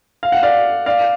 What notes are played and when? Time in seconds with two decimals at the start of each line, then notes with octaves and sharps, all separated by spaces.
0.23 F5
0.32 F#5
0.43 D5 F5
0.86 D5 F5